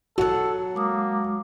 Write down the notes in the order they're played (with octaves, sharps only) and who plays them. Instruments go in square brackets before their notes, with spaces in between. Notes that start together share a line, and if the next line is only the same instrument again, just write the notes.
[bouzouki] F#3 F#5 [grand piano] F#4 [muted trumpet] A4
[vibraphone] G#3 D6 D#6 [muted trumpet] A#3